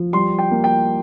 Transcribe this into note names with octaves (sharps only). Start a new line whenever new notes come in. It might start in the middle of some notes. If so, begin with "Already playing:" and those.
Already playing: F3
G3 C6
G5
A#3
G5